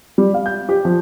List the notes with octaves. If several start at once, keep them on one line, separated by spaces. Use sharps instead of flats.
G3
F5
G6
G4
F3